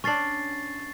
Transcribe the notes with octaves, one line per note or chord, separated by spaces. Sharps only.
C#4 D4 C#6 A6 C7